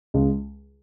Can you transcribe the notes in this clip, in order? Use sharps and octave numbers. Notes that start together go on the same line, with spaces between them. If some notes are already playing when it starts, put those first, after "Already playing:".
C#2 G#3